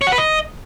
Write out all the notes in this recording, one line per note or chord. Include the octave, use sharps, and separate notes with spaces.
C#5
F#5
B4
D#5